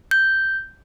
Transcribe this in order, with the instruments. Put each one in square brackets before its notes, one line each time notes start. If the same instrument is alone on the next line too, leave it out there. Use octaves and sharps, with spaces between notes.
[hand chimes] G6